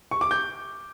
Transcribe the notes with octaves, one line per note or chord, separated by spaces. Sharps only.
C#6
D6
G6